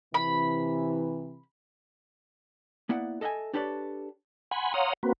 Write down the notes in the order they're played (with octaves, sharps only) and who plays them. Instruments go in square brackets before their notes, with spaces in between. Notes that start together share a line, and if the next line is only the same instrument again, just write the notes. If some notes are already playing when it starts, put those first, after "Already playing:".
[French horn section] C3 E3 [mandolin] B5
[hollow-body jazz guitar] A#3 B3 E4 D5 F#5
A4 D#5 E5 F#5 G#5
D4 G4 A4 B4 C#5 D5
[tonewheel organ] F#5 G#5 B5 C6
C#5 F5 F#5 A#5 C6 D#6
A#3 C4 F#4 B4